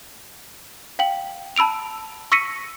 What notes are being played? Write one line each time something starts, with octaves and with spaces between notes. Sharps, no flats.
F5 G5 F#7
A5 B5 E6 D7 F7
C#6 E6 A#6 B6 C#7 D#7